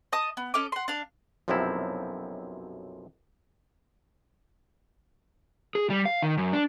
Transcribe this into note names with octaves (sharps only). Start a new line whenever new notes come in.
D#5 A5 D#6
B3
C#4 A4 D#5 D6
F#5 C6
D4 F5
B1 F#2 C3 F3 C4 E4
G#4
G3
F5
D#3
F#2
D4